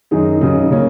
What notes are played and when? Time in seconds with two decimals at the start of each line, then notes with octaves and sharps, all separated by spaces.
0.11 F#2 D#3 F#3 D#4 G#4
0.41 C#3 F#3 D#4
0.71 C#3 A#3 C#4